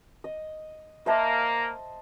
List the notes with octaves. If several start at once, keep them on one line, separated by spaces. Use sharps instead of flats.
D#5
A#3 C5 D#5 E5 A5 A#5 C6